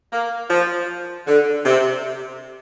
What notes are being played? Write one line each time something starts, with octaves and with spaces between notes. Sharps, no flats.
A#3
F3
D3
C3